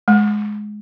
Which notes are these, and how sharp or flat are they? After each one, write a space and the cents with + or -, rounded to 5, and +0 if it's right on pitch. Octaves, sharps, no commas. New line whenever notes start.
G#3 +15